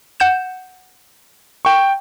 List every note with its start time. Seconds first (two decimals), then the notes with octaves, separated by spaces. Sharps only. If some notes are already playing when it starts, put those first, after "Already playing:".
0.20 F#5 G6 E7
1.65 G5 C#6